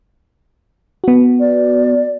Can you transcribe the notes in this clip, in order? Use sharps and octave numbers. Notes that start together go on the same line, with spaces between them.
B3 F#4
D5